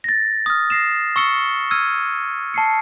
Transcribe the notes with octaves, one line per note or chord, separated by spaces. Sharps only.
A6 A#6
D#6 F6
A#6 C7 E7
C#6 E6 C#7 G7
E6 F6 G#6 D#7
A5 C7 C#7